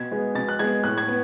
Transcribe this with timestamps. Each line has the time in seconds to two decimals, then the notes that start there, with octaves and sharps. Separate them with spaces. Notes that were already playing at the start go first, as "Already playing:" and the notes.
Already playing: B2 G#6
0.11 G#3 B3
0.35 B2 A6
0.49 F#6
0.59 G#3 B3 G#6
0.84 A2 F#6
0.98 G#6
1.08 B3